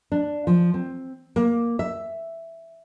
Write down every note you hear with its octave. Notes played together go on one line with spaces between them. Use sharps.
D4
F3
C4
A#3
E5